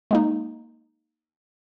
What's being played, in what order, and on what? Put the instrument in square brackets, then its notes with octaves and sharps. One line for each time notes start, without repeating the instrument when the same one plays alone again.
[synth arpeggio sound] G#3 A#3 D#4